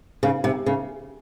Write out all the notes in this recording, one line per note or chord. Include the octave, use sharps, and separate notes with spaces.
C#3
C3
C#3